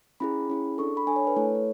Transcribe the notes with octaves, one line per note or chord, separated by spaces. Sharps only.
C#4 E4 G#4 B5
C#4 E4 G#4
D4 A4 C#6
B5
D4 A4 G#5
C#5
B4
A3 E4 A4 C#5
C#5